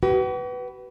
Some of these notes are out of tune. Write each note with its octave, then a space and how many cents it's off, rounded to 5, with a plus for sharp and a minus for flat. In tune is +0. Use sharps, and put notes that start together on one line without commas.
F#4 +45 B4 +0